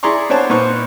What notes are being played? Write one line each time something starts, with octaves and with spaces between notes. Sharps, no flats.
E4 G#4 D5 A#5 C6 C#6
B3 C4 D4 C5 C#5 A5
A#2 C4 D#4 B4 C5 C#6